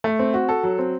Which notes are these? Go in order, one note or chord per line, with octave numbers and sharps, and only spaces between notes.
A3
C4
F#4
A4
F#3
C4